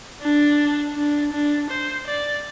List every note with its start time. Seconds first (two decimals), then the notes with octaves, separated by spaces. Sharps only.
0.22 D4
0.97 D4
1.33 D4
1.71 C5
2.07 D5